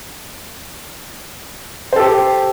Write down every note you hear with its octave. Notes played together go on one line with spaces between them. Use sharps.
G4 A4 C5